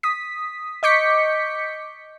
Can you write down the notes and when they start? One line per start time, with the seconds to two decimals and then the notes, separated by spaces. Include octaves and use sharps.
0.03 D#6 B6
0.83 D#5 C#6 D6 G6 B6 C#7